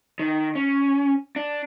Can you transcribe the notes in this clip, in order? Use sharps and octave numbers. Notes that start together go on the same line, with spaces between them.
D#3
C#4
D4